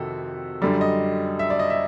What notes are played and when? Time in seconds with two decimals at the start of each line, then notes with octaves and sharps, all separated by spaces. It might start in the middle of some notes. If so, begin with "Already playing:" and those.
Already playing: F2 C3 D#3 F#4 A4
0.62 F#2 D3 G3 D5
0.81 D#5
1.39 E5
1.50 D5
1.59 D#5
1.70 E5